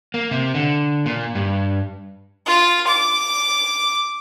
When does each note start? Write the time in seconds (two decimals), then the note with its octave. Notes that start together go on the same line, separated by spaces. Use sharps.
0.14 A#3
0.31 C3
0.54 D3
1.06 A#2
1.35 G2
2.47 F4
2.87 D6